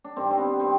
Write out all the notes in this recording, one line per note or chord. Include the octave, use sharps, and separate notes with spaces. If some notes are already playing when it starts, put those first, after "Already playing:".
D4
G2 D#3 C4
C4
B3
D#3 C4